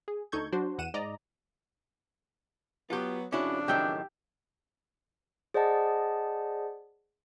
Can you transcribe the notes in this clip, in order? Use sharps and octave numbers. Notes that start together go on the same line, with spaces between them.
G#4
D2 D#4 A4 C#6 G6 G#6
F#3 D4 F#4 C5
E2 F#5 D#7 E7
G#2 D5 D#5 A#5
F#3 B3 F4 G4
F2 C#3 C#4 D4 E4 F#4
F#2 A2 D#3 G4 E5 G5
G#4 C5 D5 D#5 F#5 A5